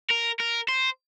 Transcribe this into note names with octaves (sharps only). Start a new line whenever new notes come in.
A#4
A#4
C5